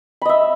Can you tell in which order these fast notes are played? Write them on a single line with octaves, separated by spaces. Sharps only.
B5 D#5 E5